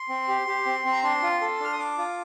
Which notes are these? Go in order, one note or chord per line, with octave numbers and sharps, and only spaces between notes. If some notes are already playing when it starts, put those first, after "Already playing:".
Already playing: C6
C4
G4
G4
C4
C4
A#5
D4 C6
F4
A4
D4 F6
D#6
D4 D6
F4